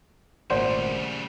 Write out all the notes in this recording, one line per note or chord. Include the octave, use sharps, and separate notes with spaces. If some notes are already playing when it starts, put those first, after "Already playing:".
G#1 A#2 C#3 G3 A3 C5 D5 F#5